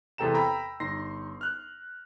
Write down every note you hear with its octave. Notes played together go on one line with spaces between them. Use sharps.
E2 C3 A4 G5 A#5 E7
G5 A#5 B5 E6
G1 D#4 C6 A#6 C7
F6 F#6